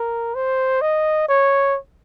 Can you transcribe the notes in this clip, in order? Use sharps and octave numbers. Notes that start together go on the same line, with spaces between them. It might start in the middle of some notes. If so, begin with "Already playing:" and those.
Already playing: A#4
C5
D#5
C#5